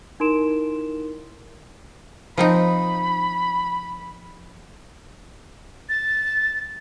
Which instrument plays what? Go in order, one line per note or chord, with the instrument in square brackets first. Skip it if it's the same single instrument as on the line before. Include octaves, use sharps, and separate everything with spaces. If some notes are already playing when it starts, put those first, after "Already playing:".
[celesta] D#4 E4 A#4 C6 D7 E7
[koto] F3 C4 D#4 [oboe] B5
[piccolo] A6